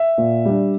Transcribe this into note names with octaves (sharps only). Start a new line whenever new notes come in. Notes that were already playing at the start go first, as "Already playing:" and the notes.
Already playing: E5
A#2
G3 D4